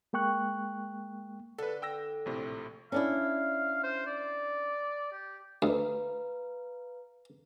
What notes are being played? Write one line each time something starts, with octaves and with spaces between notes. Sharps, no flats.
G#3 A#3 G5 C#6 F#6
D3 A4 B4
G5 E6 A#6
A#1 A2 C3
C#4 D4 E4 F5
C5
D5
G4
D2 B4 F5 A#5